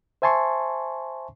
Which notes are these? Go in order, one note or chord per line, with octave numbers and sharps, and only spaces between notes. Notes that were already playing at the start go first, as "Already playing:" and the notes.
C5 E5 G#5 A5 C6 C#6